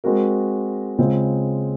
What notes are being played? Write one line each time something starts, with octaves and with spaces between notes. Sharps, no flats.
G#3 C4 F#4 A#4
C#3 G#3 C4 F4